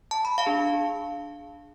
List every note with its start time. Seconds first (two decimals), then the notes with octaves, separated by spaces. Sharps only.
0.11 A5
0.25 B5
0.38 F5 A5
0.46 D4 G#4